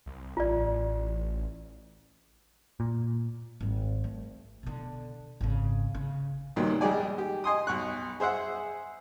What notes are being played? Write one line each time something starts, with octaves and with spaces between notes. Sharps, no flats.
C2
A1 F4 D5
A#2
G#1 G3
A3
B2 D3
G#1 C#3
C#3
C2 G2 A#2 D#3 F#3
A#1 G3 G#3 G4 D5 G#5
G4
D#5 G#5 C6 D#6
B1 C#6 F#6
G#4 C5 E5 F#5